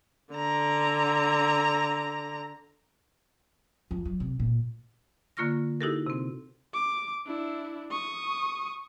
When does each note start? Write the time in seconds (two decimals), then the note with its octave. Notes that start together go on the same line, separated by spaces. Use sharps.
0.34 D3 A#5
3.91 F2
4.05 F#3
4.20 C3
4.40 A#2
5.37 D3 A#3 F4 C#6 F6 A#6
5.81 D#4 E4 F#4 G4 A4 A#4
6.06 C3 C4
6.74 D6
7.26 D4 E4
7.91 C#6 D#6